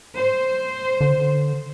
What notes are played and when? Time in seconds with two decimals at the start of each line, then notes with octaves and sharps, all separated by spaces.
0.17 C5
1.01 D3